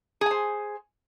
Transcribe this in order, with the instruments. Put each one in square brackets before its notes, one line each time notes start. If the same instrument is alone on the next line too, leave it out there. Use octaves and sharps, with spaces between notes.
[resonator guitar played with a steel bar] G#4
G#5
C5